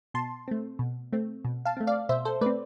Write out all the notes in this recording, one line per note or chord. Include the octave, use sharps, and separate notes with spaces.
B2 A5 C6
A3 C4
B2
A3 C4
B2
F5 A5
A3 C4
D5 F5
B2 C5 E5
A4 C5
A3 C4 B4 D5